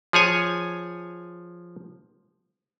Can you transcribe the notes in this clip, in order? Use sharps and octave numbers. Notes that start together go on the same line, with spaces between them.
F3 G#4 C#5 G#5